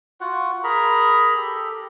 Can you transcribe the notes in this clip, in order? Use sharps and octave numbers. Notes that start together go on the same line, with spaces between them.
F4 F#4 F#5
G#4 A#4 A#5 B5
G4 A4